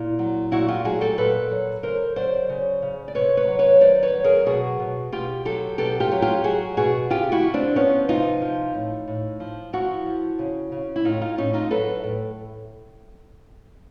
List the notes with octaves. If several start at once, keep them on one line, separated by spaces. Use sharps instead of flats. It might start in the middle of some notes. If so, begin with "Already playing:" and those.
Already playing: A#2 E4
F#3
A#2 E4 F#4
F4 G4
F#3 F#4 G#4
G4 A4
A#2 A4 B4
F#3
C#3 A#4 C5
F#3 C5 D5
C#3
C#3
D5
C3 B4 C#5
B4 C#5
F#3
B4 C#5
D#3 C5 D5
B4 C#5
F#3
G#4 A#4
B2 F#4 G#4
B2
B2 F4 G4
F#3 G4 A4
B2 G4 A4
F4 G4
F#3
F4 G4
F#3 F#4 G#4
B2 F#4 G#4
C3 F4 G4
E4 F#4
F3
C4 D4
F3 B3 C#4
C3 D#4 F4
F3
A2
A2
F3
F3 E4 F#4
F3
C#3
C#3
E4
A2 D#4 F4
D#4 F4
A2 C#4 D#4
D#4 F4
F#3 A4 B4
A2